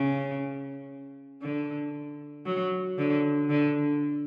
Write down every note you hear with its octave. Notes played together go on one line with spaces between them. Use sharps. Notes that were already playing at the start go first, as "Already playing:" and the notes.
Already playing: C#3
D3
F#3
D3
D3